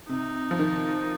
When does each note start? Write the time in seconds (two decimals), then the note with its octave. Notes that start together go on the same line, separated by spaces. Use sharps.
0.09 C3 D#4
0.51 F3
0.59 D#3